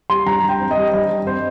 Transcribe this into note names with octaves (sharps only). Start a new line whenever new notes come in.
G3 C6
G2 A#5
G2
G5
C4
D#5
G3
G2 D#5
G2
C4 C5